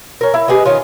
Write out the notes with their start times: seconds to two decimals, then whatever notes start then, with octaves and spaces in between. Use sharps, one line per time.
0.21 C#4 A#4
0.34 E4
0.48 G4 G#4 B4 D#5
0.65 D#3 C#4 F4